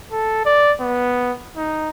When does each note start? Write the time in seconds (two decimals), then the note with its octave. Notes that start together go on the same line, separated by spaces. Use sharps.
0.12 A4
0.46 D5
0.81 B3
1.57 D#4